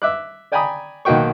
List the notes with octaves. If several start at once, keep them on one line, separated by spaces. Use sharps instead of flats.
E5 D6 F#6
D5 G5 G#5 A#5 B5 D#6
B1 D#3 A#3 F#4 G5 C#6